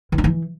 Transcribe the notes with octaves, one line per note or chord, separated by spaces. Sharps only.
E3
D#4
E3